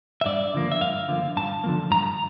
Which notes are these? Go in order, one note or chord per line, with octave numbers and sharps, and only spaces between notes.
E5
G2 D5
D3 F3 A#3
E5
G2 F5
D3 F3 A#3
G2 A5
D3 F3 A#3
G2 A#5